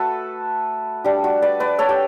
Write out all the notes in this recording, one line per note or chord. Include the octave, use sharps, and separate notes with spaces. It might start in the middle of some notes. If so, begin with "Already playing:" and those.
Already playing: A3 F#4 A4 B4
G3 D4 G4
F#4
B4 D5
B4 D5
A4 C#5
G4